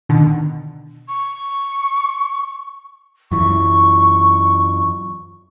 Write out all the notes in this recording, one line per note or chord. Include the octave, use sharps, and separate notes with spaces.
B2 D3 D#3
C#6
F#2 E3 C#6